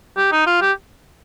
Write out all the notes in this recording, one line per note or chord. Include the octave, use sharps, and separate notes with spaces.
G4
D#4
F4
G4